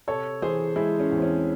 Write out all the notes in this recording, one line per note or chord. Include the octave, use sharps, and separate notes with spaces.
C3 A4 C#5
E3 G#4 C5
G#3 E4 G#4
C#4
E2
C4
C#4